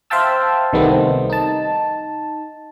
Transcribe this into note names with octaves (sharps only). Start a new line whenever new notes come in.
C5 E5 F5 G5 A5 E6
C2 D#3 G3 A3 B3 C4
D#4 A5